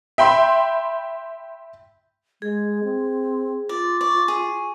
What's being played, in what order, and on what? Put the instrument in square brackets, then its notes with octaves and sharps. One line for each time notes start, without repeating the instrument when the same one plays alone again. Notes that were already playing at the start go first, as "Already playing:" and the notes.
[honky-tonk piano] E5 G5 B5 C6
[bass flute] G#3 [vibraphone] G#4
[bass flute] C4
[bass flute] F4 [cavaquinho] D5
[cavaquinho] D5 [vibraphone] C#6
[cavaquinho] G#4